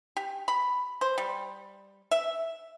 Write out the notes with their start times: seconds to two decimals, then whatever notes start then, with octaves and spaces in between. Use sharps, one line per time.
0.17 G4
0.48 B5
1.01 C5
1.18 G3
2.11 E5